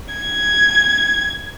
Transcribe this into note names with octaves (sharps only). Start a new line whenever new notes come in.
G#6